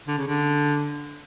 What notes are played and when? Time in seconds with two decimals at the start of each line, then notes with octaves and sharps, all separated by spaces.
0.08 D3
0.17 C#3
0.27 D3